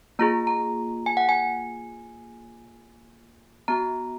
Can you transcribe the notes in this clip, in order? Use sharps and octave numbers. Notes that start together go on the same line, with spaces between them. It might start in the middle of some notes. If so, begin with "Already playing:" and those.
A#3 F4 G#4 A#5
A#5
G#5
F#5
G#5
B3 F#4 A#5